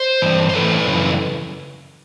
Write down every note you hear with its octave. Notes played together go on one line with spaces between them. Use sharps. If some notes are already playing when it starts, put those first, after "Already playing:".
Already playing: C5
G2 E3
C5
G2 E3 A4 B4
F#2 C#3 E3